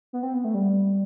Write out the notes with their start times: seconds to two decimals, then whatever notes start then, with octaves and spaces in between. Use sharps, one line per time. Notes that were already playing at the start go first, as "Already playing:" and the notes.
0.13 B3
0.23 C4
0.34 B3
0.44 A3
0.54 G3